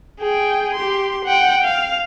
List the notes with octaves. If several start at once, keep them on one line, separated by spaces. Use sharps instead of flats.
G#4 G5
G4 C6
F#5 G5
F5